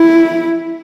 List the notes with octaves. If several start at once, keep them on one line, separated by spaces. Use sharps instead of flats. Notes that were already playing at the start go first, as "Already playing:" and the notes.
Already playing: E4